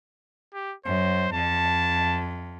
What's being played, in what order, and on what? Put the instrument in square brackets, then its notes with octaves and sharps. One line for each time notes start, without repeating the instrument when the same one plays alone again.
[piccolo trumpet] G4
[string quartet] F#2 [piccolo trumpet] C5
[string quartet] F2 [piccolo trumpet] A5